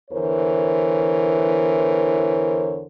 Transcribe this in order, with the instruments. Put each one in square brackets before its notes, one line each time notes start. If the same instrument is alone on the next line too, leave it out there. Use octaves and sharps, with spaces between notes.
[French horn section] E2 D3 E3 A#4 C5 C#5